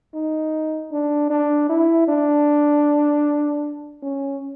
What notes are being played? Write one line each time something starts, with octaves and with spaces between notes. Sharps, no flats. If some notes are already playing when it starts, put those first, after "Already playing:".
D#4
D4
D4
E4
D4
C#4